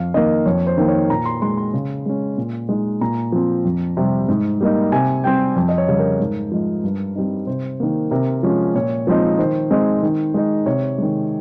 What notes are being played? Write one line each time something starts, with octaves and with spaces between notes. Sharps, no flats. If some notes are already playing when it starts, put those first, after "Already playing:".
Already playing: F2 F5
D#3 A#3 D#5
F2 C#5
C5
D#3 A#3
C#5
A#2 A#5
C6
G#3 D#4 C6
C6
C#3
G#3 C#4
A#2
G#3 D#4
A#2 A#5
F3 C4
F2
C3 G3
G#2
G3 A#3 D#4
C3 G#5
G3 C4 G5
F2
D#5
C#5
C#3 G3 C#4
A#4
G#2
F3 G#3 D#4
G2
G3 C4 D#4
C3 C5
D#3 A#3
C3 A#4
F3 G#3 C#4
A#2 C#5
F3 G#3 C4 D#4
D#3 C5
G#3 C4 D#4
D#3
G#3 D#4
C3 C#5
D#3 G#3